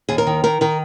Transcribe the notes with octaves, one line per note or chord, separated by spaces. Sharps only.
D#2 G#4
A#4
D#3
D#3 A#4
D#3 A#4